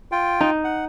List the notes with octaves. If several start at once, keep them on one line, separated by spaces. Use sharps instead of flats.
F4 G5
D#4
F#5